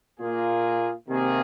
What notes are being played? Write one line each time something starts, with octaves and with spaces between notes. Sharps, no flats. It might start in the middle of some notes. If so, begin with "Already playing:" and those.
A#2 A#3 F4 G#4
C3 D#3 A#3 G#4